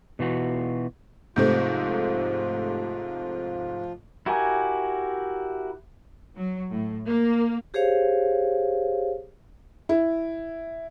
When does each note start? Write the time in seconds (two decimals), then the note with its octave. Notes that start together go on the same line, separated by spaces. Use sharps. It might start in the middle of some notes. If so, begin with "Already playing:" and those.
0.19 B2 E3 F4 F#4
1.36 G#2 C3 F3 A3 F4 C5 G6
4.26 E4 F#4 G4 A#4 G#5
6.36 F#3
6.71 A2
7.06 A#3
7.74 G4 G#4 C5 C#5 F5
9.89 E4